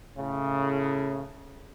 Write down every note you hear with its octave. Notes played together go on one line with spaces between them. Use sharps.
A2 C#3